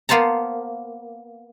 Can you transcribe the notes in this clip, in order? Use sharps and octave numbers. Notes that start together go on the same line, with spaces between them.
A#3 B3 C5 A5 A#5